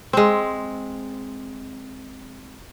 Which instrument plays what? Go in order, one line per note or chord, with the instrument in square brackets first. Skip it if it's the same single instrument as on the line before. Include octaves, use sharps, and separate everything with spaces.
[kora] G#3 C4